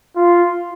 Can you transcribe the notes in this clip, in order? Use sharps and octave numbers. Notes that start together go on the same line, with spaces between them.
F4